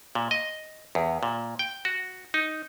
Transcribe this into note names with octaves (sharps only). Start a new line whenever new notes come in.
A#2
D#5
E2
A#2
G5
F#4
D#4